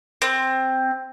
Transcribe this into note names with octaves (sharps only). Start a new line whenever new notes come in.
C4